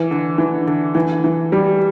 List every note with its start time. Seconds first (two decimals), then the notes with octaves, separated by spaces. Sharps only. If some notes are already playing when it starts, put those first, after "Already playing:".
Already playing: E3
0.11 D3
0.38 E3
0.67 D3
0.95 E3
1.24 E3
1.52 G3